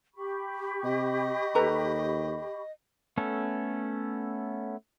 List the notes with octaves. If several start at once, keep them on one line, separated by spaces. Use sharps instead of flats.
G4 B5 C#6
C3 D#5
D#2 A4 B4 A#5
A3 B3 C#4 A4